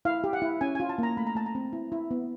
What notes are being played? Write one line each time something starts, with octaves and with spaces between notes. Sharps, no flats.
E4 F5
G4
F#5
E4
C#4 G#5
F4 G#5
A5
A#3 A#5
A3 B5
A#5
A3 A5
A#5
C4
E4
E4
B3